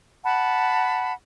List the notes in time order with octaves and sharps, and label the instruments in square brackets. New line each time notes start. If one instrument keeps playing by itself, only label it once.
[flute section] F#5 A5 B5